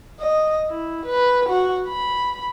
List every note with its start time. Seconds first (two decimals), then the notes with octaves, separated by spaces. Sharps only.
0.19 D#5
0.68 E4
1.06 B4
1.49 F#4
1.88 B5